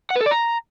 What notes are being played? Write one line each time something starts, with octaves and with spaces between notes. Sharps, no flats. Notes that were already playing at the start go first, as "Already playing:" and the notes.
F#5
B4
A4
D5
A#5